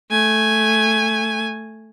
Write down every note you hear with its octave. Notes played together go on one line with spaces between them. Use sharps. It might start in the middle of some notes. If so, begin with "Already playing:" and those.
A3 G#5